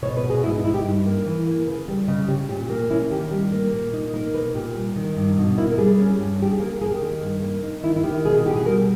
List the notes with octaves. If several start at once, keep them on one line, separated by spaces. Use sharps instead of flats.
B2 C#5
B4
B2
G#4
G#2 E4
D#4
D#4 E4
G4
G2
A#3
E3
A#3
C#3 B4
G3
C#3 D#5
C#4 G4
A#2 G4
A#3
C#4 E4
D#3 G4
G3
A#3
A#2
D#4
A#3 A#4
B2 B4
A#2 G4
G3
D#3
G2
B2 D#4
A#3 E4
A#4
G3 G#4
C#4
G2
G3 G4
G#4
A#3 A#4
A#3 G#4
G4
D#3
G2
A#3
D#4
D#3 E4
E4
D#3 G4
B2 G#4
B2 G4
G#4
G3 A#4